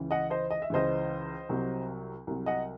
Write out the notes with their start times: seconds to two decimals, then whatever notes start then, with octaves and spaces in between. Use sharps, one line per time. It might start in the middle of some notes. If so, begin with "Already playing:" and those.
Already playing: C#2 C#3 E3
0.11 D#5 F#5
0.30 C5 D#5
0.51 D#5
0.62 E5
0.70 C#2 C#3 E3 C5 D#5
1.49 C2 C3 F#3
2.27 C2 C3 F#3
2.46 D#5 F#5